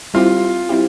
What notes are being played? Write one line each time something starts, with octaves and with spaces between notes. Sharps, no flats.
G3 C4 E4 F4 G4
G3 C4 E4 G4